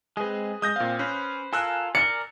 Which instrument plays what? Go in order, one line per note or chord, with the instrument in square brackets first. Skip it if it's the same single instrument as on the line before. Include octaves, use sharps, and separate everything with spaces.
[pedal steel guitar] G#3 C4 [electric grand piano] G#4 B4
[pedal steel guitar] G#3 [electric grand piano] D#6 G6 A#6
[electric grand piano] A#2 F5 [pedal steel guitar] C4
[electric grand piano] C#4 [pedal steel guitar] B4 C5
[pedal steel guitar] F4 A4 A#4 [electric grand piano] G#5 E6 F#6
[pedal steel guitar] A#4 D5 [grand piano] C#7